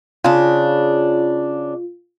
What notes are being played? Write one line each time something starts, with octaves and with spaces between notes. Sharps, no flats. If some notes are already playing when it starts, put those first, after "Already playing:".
C#3 D4 F4